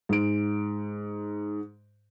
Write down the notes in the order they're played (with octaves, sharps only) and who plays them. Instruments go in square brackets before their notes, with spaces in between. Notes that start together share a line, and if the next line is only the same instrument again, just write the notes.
[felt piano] G#2 D7